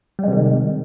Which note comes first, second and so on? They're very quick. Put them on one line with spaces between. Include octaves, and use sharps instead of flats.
G3 G#3 C3 D#3